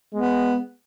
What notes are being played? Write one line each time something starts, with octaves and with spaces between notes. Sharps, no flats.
G#3 B3